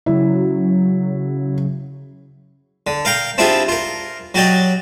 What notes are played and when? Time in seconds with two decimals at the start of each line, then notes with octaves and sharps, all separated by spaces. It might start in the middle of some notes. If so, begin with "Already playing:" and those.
0.06 C#3 F#3 E4
2.87 D3
3.05 A#4 F5 G5 A#5
3.38 C4 D4 E4 F4 G4 G#4
3.68 F4 A#4
4.34 F#3 F#4 G4 D5 D#5